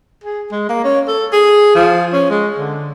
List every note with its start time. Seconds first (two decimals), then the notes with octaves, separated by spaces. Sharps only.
0.24 G#4
0.52 G#3
0.69 A#3
0.84 C#4
1.08 A4
1.32 G#4
1.75 F3
2.13 C#4
2.30 G#3
2.58 D3